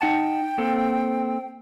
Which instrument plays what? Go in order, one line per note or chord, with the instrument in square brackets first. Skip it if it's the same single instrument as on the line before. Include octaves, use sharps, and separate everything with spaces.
[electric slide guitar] D#4 F#5 A5 [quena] G5
[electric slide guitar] A#3 C4 A4